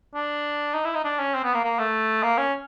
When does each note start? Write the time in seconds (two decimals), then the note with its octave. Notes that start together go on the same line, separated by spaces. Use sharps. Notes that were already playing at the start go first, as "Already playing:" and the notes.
0.15 D4
0.74 D#4
0.84 E4
0.95 D#4
1.04 D4
1.19 C#4
1.35 C4
1.44 B3
1.54 A#3
1.64 A#3
1.79 A3
2.23 A#3
2.38 C#4